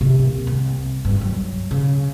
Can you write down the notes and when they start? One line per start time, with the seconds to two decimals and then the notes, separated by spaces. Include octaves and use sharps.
0.01 C3
0.19 A#3
0.47 C2
1.05 G2
1.21 F#3
1.71 C#3